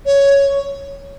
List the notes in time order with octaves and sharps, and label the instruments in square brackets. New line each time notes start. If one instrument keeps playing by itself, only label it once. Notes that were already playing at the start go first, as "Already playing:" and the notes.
[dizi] C#5